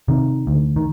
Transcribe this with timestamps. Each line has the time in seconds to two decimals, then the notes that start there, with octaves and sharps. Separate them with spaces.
0.08 C3 D#3
0.47 D2
0.76 D#3